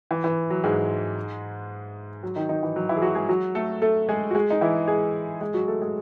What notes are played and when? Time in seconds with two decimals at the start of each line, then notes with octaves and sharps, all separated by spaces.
0.11 E3
0.24 E3
0.50 F#3
0.64 G#2 G#3
2.23 F#3
2.36 D#3 D#4
2.49 D#3 D#4
2.63 E3
2.76 F#3
2.89 E3 E4
2.97 G#4
3.02 F#3 F#4
3.15 G#3 G#4
3.29 F#3 F#4
3.55 A3 A4
3.82 A3 A4
4.09 G#3 G#4
4.31 F#4
4.35 G#3 G#4
4.50 D#4
4.61 E3 E4
4.88 G#3 G#4
5.41 G#3 G#4
5.54 F#3 F#4
5.68 A3 A4
5.82 G#3 G#4